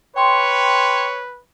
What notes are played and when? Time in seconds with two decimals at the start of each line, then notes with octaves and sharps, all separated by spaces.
0.16 B4 C#5 G5 C6